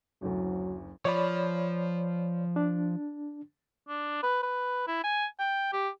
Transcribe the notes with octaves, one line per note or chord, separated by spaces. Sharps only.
F#1 D2 F#3
F3 C#5 D5 B5
D4
D4
B4
B4
E4
G#5
G5
G4